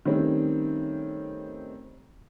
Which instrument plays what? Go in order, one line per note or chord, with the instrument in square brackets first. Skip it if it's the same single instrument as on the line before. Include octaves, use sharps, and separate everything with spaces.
[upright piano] D#3 G3 A3 C4 C#4